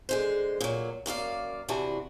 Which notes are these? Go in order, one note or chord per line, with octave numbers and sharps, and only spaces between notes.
D3 G#3 C5
A#2 F#3
F#2 A#3 D5 F5
C3 E3 D4 F#4